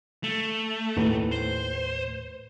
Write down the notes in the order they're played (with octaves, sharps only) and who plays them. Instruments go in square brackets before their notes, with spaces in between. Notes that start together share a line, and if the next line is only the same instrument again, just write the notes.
[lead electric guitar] A3
[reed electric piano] D#2 A2 B4
[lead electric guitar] C5